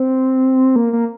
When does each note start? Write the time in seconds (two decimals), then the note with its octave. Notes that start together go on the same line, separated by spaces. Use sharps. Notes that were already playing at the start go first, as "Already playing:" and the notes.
Already playing: C4
0.76 A#3
0.93 A#3